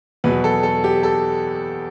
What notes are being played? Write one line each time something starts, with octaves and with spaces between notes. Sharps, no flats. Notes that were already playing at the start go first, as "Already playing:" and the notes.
E2 B2 F#3 B4
A4
A4
G4
A4